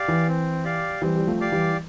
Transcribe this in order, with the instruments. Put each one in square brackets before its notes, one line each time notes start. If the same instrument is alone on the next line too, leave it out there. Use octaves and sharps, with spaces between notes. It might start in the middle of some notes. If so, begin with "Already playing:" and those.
Already playing: [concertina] G4 D5 F5
[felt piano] E3
[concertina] C4
G4 D5 F5
[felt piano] E3 G3 [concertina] C4
[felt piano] G3
F3 A3
[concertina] G4 D5 F5
[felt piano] E3 G3